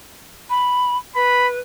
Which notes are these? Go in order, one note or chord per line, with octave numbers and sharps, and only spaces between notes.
B5
B4 B5